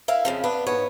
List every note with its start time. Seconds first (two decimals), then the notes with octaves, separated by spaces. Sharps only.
0.08 E4 A#4 E5 F5
0.25 F2 C#3 F3
0.44 B3 D4 B4
0.67 E2 G#2 B3 C#5